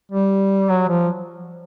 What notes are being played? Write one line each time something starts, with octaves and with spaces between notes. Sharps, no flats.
G3
F#3
F3